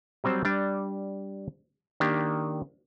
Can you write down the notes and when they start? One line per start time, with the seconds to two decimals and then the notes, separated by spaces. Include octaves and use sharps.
0.24 F#3 G3 C4 C5
0.45 G3 D4 D5
2.00 D#3 A#3 D4 G4